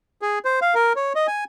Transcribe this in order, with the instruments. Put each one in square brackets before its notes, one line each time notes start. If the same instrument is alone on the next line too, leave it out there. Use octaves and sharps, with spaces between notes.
[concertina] G#4
C5
F5
A#4
C#5
D#5
G#5